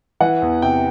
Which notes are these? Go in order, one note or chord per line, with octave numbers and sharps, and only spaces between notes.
E3 F#5
E2
C3 G5